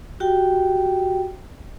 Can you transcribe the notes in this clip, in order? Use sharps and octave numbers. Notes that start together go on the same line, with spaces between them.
F#4 G4 G5